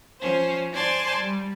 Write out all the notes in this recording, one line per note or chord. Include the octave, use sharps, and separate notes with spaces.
F3 C#4 C5
C5 D5 G#5 A5 C6
G3